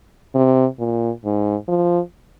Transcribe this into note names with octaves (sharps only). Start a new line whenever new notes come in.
C3
A#2
G#2
F3